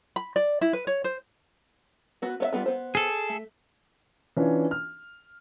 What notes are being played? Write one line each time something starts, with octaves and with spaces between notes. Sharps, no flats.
B5
D5
E4
B4
C#5
C5
B3 F#4 B4
B3 C#5 E5
G3 B3 F4
B3 C5
G#4 A4
A3
E3 C#4 D4 F4
F6